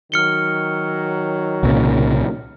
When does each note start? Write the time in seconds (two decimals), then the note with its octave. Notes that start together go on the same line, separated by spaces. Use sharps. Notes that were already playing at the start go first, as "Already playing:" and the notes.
0.12 D#3 F#3 F6 C#7 G7
1.63 C2 A#2 C#3